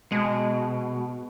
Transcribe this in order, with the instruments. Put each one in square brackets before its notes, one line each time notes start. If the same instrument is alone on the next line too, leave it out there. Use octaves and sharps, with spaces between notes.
[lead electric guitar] B2 [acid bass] G#3